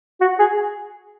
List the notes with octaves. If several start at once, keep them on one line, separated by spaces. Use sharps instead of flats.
F#4
G#4